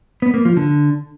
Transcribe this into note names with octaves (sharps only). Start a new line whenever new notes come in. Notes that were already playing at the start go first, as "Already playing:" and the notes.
B3
A#3
F3
D3